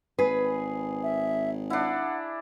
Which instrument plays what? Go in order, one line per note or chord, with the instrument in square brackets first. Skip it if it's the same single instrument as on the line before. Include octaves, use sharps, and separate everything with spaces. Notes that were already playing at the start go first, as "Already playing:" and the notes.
[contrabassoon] G#1 [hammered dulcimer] G#4 [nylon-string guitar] B4
[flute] E5
[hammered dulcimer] D4 E4 [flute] F#5